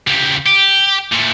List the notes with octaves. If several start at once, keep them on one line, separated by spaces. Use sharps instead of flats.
C#2 G3
G4
A#2 A3